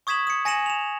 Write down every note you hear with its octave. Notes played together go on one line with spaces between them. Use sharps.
C#6 D#6 G#6 B6 E7 F#7
D#6 C#7
G#5 A#6 C#7 D#7 E7 F#7
E7 F7